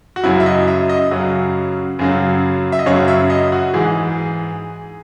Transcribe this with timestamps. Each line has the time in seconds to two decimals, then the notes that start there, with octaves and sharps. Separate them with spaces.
0.16 F#4
0.23 F#2 C#3 F#3 E4
0.40 E5
0.46 D#5
0.67 E5
0.89 D#5
1.11 F#2 C#3 F#3
1.99 F#2 C#3 F#3
2.72 E5
2.79 D#5
2.86 F#2 C#3 F#3 C#5
3.08 E5
3.30 D#5
3.52 F#4
3.74 G#2 E3 G#4